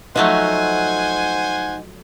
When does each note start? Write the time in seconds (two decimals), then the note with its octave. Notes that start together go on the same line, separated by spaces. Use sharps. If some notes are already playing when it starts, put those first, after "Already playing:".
0.16 F3 F#3 A3 D#4 C5 F#5 G#5